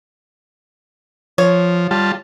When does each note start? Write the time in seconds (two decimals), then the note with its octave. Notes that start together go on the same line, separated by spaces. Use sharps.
1.38 F3 C#5
1.91 G3 F4 A5